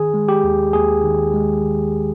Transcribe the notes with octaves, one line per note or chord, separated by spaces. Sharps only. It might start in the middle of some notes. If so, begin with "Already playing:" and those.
Already playing: D#3 G#4
G#3
G4
D#2
D#2 G#4
D#3
G#3
D#2